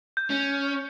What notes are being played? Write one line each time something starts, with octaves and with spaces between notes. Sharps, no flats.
G6
C#4